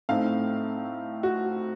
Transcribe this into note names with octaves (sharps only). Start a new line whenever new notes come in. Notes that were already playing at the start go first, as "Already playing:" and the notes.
A2 A3 C4 D#4 F5
F#4